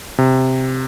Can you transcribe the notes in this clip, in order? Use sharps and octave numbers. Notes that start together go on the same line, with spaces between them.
C3